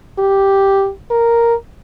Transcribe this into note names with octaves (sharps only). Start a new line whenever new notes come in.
G4
A#4